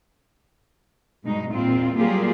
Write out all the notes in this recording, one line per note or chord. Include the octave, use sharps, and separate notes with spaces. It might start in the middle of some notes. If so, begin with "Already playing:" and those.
G2 B2 G#3 D#4
E2 A#2 C4 F4
F#3 G3 A#3 F4 G4 G#4